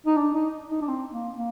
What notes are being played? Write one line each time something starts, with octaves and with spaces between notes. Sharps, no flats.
D#4
D4
D#4
D#4
D4
C4
A#3
A#3